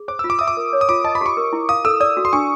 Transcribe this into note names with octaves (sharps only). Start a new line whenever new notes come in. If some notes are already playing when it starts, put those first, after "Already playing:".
Already playing: G#4
C5 D6
F4 E6
D6
E5 D#6
D6
A#4
C#5
D#6
F4 D6
D#5 A5
B5
G4 C#6
A#4
E4
F5 D#6
A4 E6
D5 D#6
F#4
C6
D4 C#6